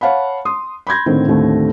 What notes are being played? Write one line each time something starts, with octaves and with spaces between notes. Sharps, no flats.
C#5 F5 F#5 A5 B5
C6 D#6
B5 C6 G6 G#6 A#6
A2 D3 D#3 C4
D#2 A2 D3 A3 C4